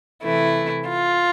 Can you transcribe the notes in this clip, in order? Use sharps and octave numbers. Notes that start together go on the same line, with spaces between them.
C3 E3 A3 E4
F4